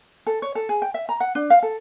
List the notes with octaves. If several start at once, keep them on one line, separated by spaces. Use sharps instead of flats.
A4
C#5
A4
G#4
G5
E5
A#5
F#5
D4
F5
A4